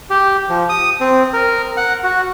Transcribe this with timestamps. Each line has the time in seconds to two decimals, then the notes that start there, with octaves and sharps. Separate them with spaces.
0.10 G4
0.49 F3
0.69 D#6
1.01 C4
1.33 A#4
1.77 F#5
2.04 F#4